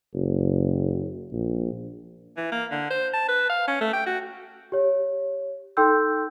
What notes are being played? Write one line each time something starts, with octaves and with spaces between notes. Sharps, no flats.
F#1
A#1
E3
A#3
D3
C5
A5
B4
F5
C#4
A3
G5
F#4
G4 C#5
D#4 A4 G5 C6 E6 G6